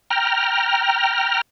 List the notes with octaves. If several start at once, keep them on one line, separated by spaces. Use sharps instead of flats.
G5 A#5 F6